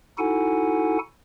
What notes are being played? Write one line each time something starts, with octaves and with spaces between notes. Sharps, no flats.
D#4 E4 F#4 A4 F#5 G#5